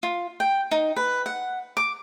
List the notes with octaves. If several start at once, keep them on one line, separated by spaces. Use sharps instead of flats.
F4
G5
D#4
B4
F#5
D6